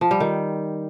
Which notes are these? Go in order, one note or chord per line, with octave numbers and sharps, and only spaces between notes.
F3
G3
D#3